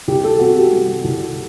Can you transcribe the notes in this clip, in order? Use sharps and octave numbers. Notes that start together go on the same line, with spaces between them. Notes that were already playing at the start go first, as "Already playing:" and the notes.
C2 G4
A4
C3 F#4
G4
G3
C2